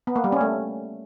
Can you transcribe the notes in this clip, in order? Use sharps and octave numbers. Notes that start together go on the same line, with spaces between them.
B3
A#3
G3
C#4
A3